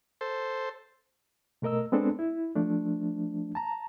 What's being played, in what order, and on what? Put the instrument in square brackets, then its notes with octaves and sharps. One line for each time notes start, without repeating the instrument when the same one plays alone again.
[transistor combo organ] A4 C5
[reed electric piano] B2 A3 A#4 D#5 E6
G#3 B3 C4 D4 A4
E4
F3 A3 D4
A5 A#5